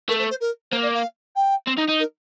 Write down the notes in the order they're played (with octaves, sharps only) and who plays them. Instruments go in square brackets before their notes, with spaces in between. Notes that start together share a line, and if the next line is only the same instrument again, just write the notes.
[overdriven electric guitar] A3 [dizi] A#4
[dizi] C5
C5
A#4
[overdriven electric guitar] A#3 [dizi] C5
[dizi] D5
F5
G5
[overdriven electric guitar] C4
D#4
D#4
[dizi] A#4